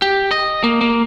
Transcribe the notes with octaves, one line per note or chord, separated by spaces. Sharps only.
G4
D#5
A#3
A#3